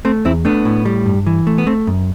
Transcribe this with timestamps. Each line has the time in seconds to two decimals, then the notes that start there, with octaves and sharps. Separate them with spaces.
0.05 A3 C4
0.25 E2 C4 E4
0.45 A3 B3 D4
0.65 A2
0.85 G3
1.06 G2
1.27 E3
1.47 A3
1.58 B3
1.67 A3 C4
1.87 F#2